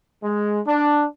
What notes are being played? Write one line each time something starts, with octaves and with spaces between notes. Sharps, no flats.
G#3
D4